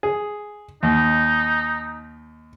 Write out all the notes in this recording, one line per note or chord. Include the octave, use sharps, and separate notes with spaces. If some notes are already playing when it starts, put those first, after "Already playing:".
G#4
D#2 D#4